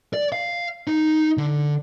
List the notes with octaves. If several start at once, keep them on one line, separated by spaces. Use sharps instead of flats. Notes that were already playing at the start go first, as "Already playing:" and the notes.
D5
F5
D#4
D3